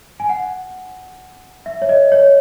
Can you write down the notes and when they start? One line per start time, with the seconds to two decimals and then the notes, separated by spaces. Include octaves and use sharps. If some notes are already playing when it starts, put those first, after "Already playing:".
0.20 G#5
0.29 F#5
1.66 E5
1.82 C#5
1.89 D#5
2.12 C#5